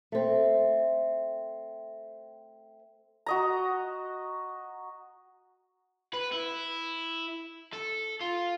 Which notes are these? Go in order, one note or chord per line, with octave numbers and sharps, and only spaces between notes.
A3 C4
F#4 D#5 A#5
B4
E4
A4
F4